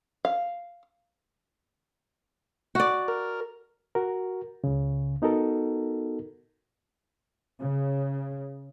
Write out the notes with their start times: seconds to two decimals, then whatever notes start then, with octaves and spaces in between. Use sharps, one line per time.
0.25 F5
2.75 F#4 D5
3.08 A#4
3.95 F#4 A#4
4.64 C#2 C#3
5.22 B3 D#4 F#4 A4 A#4
7.59 C#3